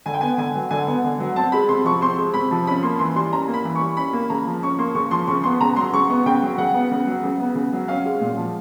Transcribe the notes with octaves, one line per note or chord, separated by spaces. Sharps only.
D3 G#5
G5
B3 G#5
D3 G#5
F#3
D3 G#5
B3
D3
F#3
C4 A5
G#3 B5
C3 C6
F3 C#6
C4 C6
G#3
C3 B5
F3
C#4 B5
A#3 C6
E3 C6
G3 C6
C#4 A#5
A#3
B5
E3
C#6
G3
C#4 B5
A#3
C#3 A#5
F3
C#4 C#6
A#3 C6
C#3 C#6
F3 C6
C#3 C#6
B3 C6
C#3 A#5
F#3 C6
C#3 C#6
B3
C#3 G5
F#3
C#3 F#5
B3
C#3
F#3
C#3
B3
C#3
F#3
C#4 F5
G#3
A#2
F3